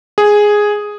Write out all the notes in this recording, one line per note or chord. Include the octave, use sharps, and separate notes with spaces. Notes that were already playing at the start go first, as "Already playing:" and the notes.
G#4